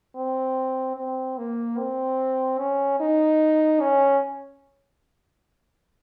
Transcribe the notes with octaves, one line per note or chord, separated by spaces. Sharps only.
C4
C4
A#3
C4
C#4
D#4
C#4